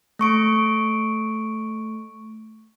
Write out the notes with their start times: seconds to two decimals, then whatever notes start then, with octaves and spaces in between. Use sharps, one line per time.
0.19 A3 C#6 D7